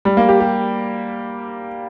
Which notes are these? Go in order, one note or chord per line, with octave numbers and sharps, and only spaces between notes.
G3
A#3
G4
G4